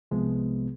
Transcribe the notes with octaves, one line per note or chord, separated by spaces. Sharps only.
C2 C3 F3 G#3 B3